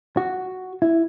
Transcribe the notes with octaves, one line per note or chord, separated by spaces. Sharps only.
F#4
E4